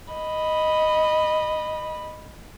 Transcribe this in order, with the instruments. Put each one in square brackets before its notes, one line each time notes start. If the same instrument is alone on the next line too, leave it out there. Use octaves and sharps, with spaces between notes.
[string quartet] D#5 B5